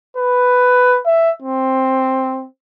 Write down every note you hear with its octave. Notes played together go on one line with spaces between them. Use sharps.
B4
E5
C4